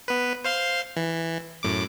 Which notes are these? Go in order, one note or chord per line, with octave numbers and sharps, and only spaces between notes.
B3 B4
C5 F5 C6
E3
F#2 A2 D6